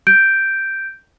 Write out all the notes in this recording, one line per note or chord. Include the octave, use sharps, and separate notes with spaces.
G6 D7